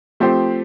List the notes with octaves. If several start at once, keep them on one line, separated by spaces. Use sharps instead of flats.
F3 A3 C4 G4 C5